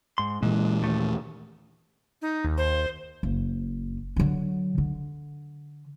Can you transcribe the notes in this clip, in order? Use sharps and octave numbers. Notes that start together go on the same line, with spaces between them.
G#2 C6
A#2 E3 G#3
D#2 A3
D#4
D#2
C5
F#1
D3 F#3
D3